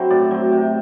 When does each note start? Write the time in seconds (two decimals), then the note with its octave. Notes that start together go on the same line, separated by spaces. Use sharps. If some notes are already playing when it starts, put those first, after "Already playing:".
Already playing: F#3 C4 D4 E4 A4 C5
0.10 A2 D5
0.31 F#3 C4
0.52 C3